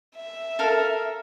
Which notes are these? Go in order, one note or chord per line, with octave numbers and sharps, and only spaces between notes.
E5
A4 A#4 F5